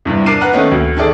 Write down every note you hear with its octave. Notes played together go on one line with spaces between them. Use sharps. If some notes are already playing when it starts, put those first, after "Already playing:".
E2 G2 C3
D4 A#4 D6 C7 D#7
B4 F#5 A#5 F6
D#3 A3 B3 C#4 D#4
D2
D#3 G#4 A4 D5